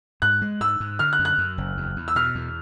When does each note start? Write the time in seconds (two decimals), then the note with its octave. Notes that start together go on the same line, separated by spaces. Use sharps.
0.22 G#2 F#6
0.42 G#3
0.61 G#2 E6
0.80 G#2
0.99 D3 F6
1.13 F#6
1.19 F#2
1.25 F#6
1.38 F#2
1.58 F#1
1.77 E2
1.96 E2
2.08 E6
2.16 B2 F6
2.35 E2